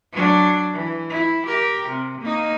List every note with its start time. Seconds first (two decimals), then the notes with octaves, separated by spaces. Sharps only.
0.12 F#3 D4
0.73 E3
1.10 E4
1.46 G4 A#4
1.89 C3
2.21 A#3 D#4